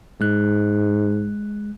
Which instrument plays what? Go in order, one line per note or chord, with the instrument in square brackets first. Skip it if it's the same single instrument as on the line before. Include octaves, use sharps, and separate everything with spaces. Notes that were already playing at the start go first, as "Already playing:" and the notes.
[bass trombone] G#2 [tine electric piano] G#3 F#6